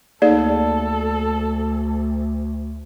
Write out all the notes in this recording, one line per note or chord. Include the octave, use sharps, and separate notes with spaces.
D2 A#3 D#4 G#4 A4 D5